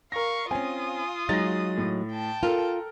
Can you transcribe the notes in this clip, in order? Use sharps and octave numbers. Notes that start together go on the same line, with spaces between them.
A#4 F5 C#6 A#6
C4 C#4 F4 G#5 D#6
F#3 G#3 D#4 A6 A#6
A2
G5 A5
F4 A4 A#4